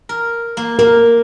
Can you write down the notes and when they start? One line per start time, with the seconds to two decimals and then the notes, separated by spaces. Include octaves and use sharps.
0.09 A#4
0.57 A#3
0.79 A#3 A#4